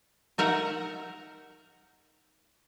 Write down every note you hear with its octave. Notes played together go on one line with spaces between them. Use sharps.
D#4 A#4 E5 F#5